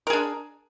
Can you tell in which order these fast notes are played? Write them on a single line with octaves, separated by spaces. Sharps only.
A#4 G#4 D4